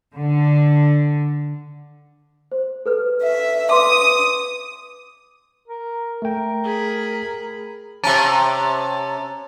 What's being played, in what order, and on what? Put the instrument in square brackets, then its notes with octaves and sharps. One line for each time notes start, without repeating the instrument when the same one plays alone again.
[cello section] D3
[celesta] C5
A4 B4 F6
[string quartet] E5
[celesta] B4 C6 D6 [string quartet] D#6
[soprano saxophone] A#4
[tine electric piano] A3 G5 [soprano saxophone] A#4
[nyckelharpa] G#4 B5
[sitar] C3 C#4 [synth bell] A5 A#5 A6